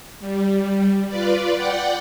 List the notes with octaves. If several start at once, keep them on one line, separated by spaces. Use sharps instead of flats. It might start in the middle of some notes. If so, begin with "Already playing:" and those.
G3
F4 B4 D5
D5 F#5 G5